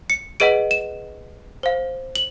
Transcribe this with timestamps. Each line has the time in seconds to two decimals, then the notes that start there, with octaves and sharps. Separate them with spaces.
0.10 C#7
0.40 G#4 B4 D#5 F#5 D7
0.71 E7
1.63 C5 F5
2.15 F#7